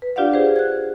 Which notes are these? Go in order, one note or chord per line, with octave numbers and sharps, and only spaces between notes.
B4
D4 F4 G4 D5 F5 F#5
G#4 C5
F#6 G#6